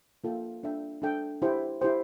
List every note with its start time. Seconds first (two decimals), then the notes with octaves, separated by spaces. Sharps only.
0.24 A#3 F4 A4 E5 G5
0.63 D4 A4 E5 G5
1.02 D4 A4 E5 G5
1.42 E4 G4 C5 G5
1.81 E4 G4 C5 G5